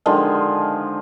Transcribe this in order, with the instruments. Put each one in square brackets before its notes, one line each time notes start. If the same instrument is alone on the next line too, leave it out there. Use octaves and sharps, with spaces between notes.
[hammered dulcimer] D3 D#3 F3 G#3